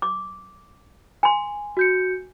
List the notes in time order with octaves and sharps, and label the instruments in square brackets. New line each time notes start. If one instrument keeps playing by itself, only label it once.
[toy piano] D6
G#5 C6
[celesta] F#4 G6 C#7